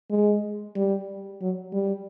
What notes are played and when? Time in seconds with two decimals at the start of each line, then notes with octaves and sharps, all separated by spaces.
0.10 G#3
0.75 G3
1.41 F#3
1.73 G3